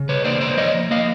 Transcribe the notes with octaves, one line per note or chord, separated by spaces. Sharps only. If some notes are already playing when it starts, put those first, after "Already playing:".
Already playing: C#3
B4 C#5
A#3 C5 D5
C5 D5
F3 C#5 D#5
A#3 D#5 F5